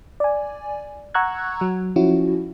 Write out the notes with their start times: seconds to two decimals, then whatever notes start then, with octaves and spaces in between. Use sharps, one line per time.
0.20 D5 G#5
1.14 F#5 A#5 C#6 E6 F#6 G#6
1.61 F#3
1.96 F3 C#4 E4 F#4